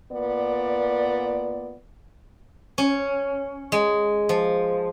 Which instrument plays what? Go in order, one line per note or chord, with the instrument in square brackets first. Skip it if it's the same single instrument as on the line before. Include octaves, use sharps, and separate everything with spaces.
[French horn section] A#2 B3 D5
[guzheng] C#4
G#3
F3